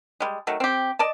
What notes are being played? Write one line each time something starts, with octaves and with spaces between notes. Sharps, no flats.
G3 G#3
D#3 F#3 A3
C4 G4
D5 D#5 A5